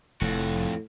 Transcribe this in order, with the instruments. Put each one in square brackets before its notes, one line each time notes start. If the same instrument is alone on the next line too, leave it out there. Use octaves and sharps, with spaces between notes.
[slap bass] F1 [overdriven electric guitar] F2 F#4 [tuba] A2